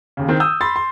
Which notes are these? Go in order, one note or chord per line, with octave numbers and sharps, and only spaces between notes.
D#2 C#3
D#3 C4
D#6 E6 G6
B5 C6 A6
C6